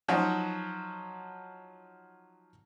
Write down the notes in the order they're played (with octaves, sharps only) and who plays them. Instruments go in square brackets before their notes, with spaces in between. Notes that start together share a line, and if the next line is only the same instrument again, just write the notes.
[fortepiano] F3 F#3 D#4 F#4